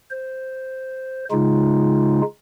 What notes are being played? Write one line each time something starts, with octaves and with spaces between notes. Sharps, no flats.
C5
C#3 G#3 D#4 F4